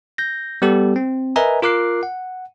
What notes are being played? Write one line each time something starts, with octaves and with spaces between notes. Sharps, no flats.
G6 A#6
G3 B3 G4 A4
C4
A#4 B4 D#5 E5 G#5 A#5
F4 A#4 D6 F#6 C7
F#5